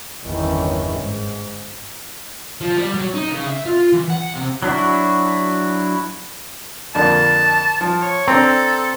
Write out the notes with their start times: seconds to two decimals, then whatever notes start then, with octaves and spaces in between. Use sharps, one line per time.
0.23 G1 E2 D#3 E3 C#4
0.95 G#2
2.61 F3
2.77 G3
2.94 F#3
3.14 D#4
3.31 C#3
3.47 E5
3.66 F4
3.93 E3
4.10 F#5
4.35 C3
4.62 F#3 D4 E4 F#4
6.95 F2 D3 A#3 A5
7.81 F3
8.01 C#5
8.28 C4 D4 A4 A#5